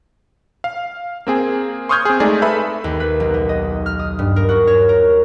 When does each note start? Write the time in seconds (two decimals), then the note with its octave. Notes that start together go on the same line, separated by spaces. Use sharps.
0.64 F5
1.27 A#3 C4 G#4
1.89 C6 C#6 D#6 F6 G6 G#6
2.05 C4 G#4
2.20 G#3 A3 D#4 G#4 D5
2.42 A4 B4 E5 B5
2.84 D#2
3.00 B4
3.20 B1
3.34 B3
3.49 D#5
3.86 F6
3.99 D#6
4.19 G2
4.36 A#4
4.49 F#4
4.67 C#5
4.89 A#4